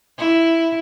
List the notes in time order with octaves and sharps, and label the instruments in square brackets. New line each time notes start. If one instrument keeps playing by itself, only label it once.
[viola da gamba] E4